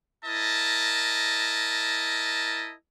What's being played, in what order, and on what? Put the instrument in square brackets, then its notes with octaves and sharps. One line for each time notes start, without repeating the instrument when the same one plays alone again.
[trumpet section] E4 A#4 D#5 A5